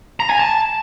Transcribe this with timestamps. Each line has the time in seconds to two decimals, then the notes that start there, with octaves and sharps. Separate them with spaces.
0.20 A#5
0.30 G#5
0.40 A5